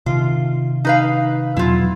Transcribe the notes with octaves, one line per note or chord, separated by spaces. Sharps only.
C3 D#3 F4
D#4 B4 F5
E2 B2 F#3 E4 F4